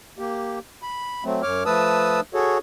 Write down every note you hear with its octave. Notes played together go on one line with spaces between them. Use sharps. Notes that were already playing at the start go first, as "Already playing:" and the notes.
A#3 G4
B5
F#3 A3 C4
F#2 C#5 D6 F6
F3 A3 B4 A5 D#6 E6
F#4 G#4 A4 C#5